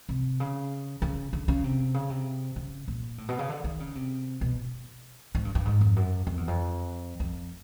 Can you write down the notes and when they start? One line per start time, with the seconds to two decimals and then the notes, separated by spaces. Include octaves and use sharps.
0.09 C3
0.40 C#3
1.02 C#3
1.33 D3
1.48 C#3
1.64 C3
1.94 C#3
2.10 C3
2.56 C#3
2.88 A#2
3.18 A2
3.29 B2
3.39 C#3
3.49 D3
3.64 D#3
3.80 C#3
3.95 C3
4.41 B2
5.35 G#2
5.45 G2
5.55 G2
5.65 G#2
5.81 F2
5.96 F#2
6.27 F2
6.37 E2
6.48 F2
7.20 F2